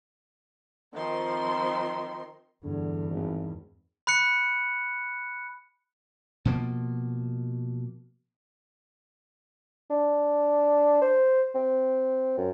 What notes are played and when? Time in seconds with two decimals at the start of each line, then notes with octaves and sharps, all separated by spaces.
0.95 D#3 F3 C4 C6
2.64 E2 G2 D3
3.11 G#1
4.07 B5 F#6 C#7
6.45 B2 F3 A#3
9.90 D4
11.01 C5
11.55 C4
12.38 F#2